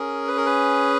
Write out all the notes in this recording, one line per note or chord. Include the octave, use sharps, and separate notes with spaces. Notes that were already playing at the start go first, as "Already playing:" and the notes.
Already playing: C#4 G#4 A#4
B4
A#4
B4